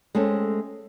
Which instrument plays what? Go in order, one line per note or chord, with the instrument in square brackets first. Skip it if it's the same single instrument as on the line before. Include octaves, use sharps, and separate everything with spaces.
[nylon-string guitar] G#3 A3 C4 C#4 A4